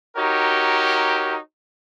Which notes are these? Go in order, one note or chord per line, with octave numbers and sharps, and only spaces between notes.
D#4 F#4 G4 A#4 C#5